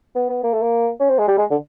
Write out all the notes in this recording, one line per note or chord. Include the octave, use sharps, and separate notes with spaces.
B3
B3
A#3
A3
A#3
C#4
C4
G#3
G3
G#3
D3